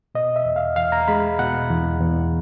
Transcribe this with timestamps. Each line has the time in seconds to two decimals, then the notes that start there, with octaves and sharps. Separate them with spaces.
0.15 B2 D#5
0.36 E5
0.45 E2
0.56 F5
0.76 E2 F5
0.92 A#5
1.08 G#3 B5
1.39 B2 F#5
1.70 E2
2.00 E2